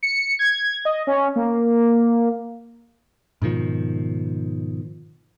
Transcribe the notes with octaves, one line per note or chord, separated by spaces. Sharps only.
C#7
G#6
D#5
C#4
A#3
G#2 B2 D#3 F3